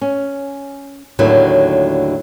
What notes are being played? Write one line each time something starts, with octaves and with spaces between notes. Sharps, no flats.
C#4
D#2 A2 D3 F#3 B3